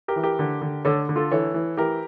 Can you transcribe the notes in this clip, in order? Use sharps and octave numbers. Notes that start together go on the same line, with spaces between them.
G4 A#4
E3
G4 A#4
D3
D3
D3 A4 C#5
D3
F4 A4
E3 A4 C#5
E3
E3 G4 A#4